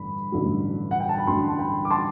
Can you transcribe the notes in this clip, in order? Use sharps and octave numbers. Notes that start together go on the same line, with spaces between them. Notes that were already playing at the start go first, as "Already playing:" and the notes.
Already playing: A1 G2 D3 B5
A1 G2 D3 F#3
F#5
G5
A5
B5
A1 G2 D3 F#3 A5 C6
A5
G5 B5
D6
A5 C6